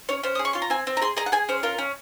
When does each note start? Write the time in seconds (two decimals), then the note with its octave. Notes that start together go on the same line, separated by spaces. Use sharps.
0.09 C#4 C#5
0.23 C#4 C5
0.35 D#6
0.39 G#4
0.45 C#6
0.53 F4 C6
0.62 A#5
0.70 C4 G#5
0.87 C4
0.97 A#5
1.02 G#4 C6
1.17 G#4 A#5
1.26 F#5
1.32 G#4 G#5
1.49 C#4 C5
1.63 F4 A#4
1.78 C#4